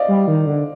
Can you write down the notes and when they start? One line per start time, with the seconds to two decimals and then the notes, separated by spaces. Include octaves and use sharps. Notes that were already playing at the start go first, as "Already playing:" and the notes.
Already playing: C5 D5 D#5 F5
0.08 G3
0.28 D#3
0.47 D3